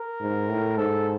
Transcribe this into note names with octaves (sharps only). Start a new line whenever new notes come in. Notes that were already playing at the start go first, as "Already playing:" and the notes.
Already playing: A#4
G#2
A2
G#2 A4